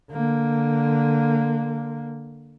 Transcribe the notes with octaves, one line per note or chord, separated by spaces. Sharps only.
D3 A#3